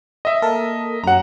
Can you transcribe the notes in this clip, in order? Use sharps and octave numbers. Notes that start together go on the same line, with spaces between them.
D#5 E5
A#3 A4 A#4
F#2 F#3 F#5 A#5